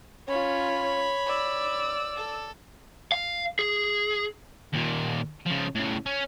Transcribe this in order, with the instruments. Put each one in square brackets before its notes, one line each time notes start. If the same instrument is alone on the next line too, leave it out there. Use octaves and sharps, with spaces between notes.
[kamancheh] C#4 F4 [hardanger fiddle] C#5 B5
[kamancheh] D5 E6
[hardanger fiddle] A4
[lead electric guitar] F5
G#4
[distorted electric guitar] D#2 A#2
C#3 F3
A2 C#3
C#4